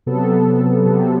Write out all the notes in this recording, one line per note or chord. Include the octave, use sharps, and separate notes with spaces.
C3 F#3 B3 A4
C3 F#3 B3